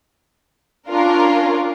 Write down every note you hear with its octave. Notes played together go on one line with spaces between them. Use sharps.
C#4 D4 F4 A#4